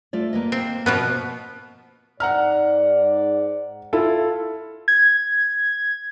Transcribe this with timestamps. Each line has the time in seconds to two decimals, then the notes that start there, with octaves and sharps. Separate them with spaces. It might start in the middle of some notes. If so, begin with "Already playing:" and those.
0.13 A3 F4 D5
0.33 A#3 B4 D#5
0.52 C4
0.86 B2 F3 B3
2.20 G#2 D5 F#5 A#5 F6
3.93 E4 F4 A4
4.88 G#6